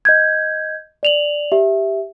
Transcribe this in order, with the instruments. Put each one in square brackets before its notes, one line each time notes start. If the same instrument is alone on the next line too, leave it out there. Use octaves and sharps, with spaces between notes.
[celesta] D#5 G6 G#6
D5 F7 F#7
G4 E5